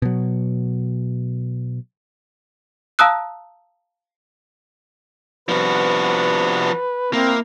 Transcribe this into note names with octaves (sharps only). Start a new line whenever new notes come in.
B2 F#3
F5 A5 A#5 D#6 E6 F#6
C3 F3 B3 D4 F#4 B4
A#3 C4 E4